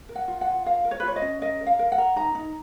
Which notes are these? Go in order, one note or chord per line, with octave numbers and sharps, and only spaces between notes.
A#4
F#5
F4
F#5
F4
A#4 F5
A#4
C#5
B4
F4 C#5
D#5
C#4
A#4 D#5
A#4
F5
A#4
F#5
A#4
D#4 A#5
D#4